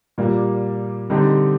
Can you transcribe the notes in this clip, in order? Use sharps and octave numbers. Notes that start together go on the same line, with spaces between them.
A#2 G3 A#3
D3 G3 C4 D#4 G4